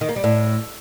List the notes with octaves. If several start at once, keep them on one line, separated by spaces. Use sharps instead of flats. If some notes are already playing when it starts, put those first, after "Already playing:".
D#3
A#3
G3
A2